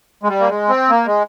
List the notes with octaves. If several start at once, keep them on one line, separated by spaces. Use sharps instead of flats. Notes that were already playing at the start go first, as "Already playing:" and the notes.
G#3
G3
A#3
G#3
C4
A#3
G#3